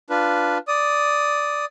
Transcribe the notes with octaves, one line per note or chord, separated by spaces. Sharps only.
D4 F4 B4
D5 D#6